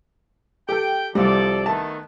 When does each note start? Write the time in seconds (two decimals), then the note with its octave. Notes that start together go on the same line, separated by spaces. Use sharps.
0.69 G4 A4 G5
1.15 C2 F3 G3 A4 D5
1.66 D#3 A3 B3 A5